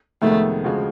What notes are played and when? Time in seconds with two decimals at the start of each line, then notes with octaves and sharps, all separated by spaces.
0.22 F2 C3 D#3 G#3 A3 B3
0.64 D2 C#3 F3 G#3